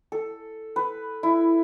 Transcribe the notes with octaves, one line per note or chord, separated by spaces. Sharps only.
A4
B4
E4